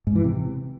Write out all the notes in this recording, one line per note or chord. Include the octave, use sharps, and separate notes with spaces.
G#2
E3
C3